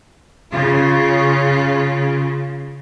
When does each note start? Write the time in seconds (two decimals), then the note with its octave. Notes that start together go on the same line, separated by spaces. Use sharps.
0.52 C#3 F4